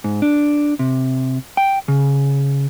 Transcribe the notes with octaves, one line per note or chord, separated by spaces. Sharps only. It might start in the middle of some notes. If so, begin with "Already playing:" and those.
G#2
D4
C3
G5
C#3